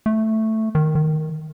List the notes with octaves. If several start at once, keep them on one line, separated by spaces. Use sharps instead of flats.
A3
D#3
D#3